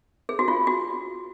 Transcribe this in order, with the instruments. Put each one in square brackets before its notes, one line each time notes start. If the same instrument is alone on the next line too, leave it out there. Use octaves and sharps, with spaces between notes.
[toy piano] G#4
F#4
F4
F#4